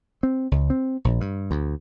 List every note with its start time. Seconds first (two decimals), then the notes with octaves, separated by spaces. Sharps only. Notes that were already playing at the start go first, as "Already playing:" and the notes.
0.23 C4
0.51 C#2
0.70 C4
1.05 A#1
1.21 G2
1.51 D2